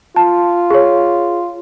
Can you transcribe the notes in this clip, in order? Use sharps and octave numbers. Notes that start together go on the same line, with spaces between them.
F4 A5
G#4 C#5